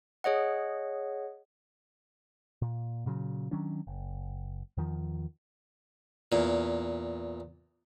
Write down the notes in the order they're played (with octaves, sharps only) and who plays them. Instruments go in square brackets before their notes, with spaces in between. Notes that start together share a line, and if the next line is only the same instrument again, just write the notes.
[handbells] G#4 C#5 D#5 F#5
[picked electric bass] A#2
A#2 C#3 F#3
D#3 F#3 C#4 D4
F#1
E2 D#3 F3
[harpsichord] E2 A#2